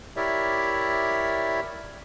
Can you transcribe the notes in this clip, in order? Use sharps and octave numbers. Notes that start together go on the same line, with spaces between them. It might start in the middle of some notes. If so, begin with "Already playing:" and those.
E4 G4 A#4 C#5 D5 E5